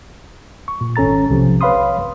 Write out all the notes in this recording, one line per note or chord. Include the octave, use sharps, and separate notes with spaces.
C#6
A#2
G#1 C#4 A4 A#5 A6
B1 C3 F3
B4 C#5 F5 B5 C6 D#6